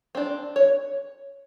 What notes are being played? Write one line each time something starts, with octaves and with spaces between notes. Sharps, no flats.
C4 D4
C#5